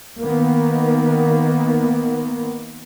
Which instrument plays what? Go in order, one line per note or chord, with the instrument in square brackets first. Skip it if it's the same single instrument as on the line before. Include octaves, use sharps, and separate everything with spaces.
[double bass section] D#3 A#3 B3